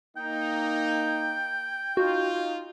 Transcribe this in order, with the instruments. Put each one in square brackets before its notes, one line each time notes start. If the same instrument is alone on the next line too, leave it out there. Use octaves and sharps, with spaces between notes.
[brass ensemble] A#3 D#4 [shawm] G5
[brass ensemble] D#4 F4 [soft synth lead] F#4